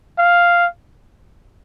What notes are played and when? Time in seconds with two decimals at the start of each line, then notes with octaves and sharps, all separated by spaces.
0.18 F5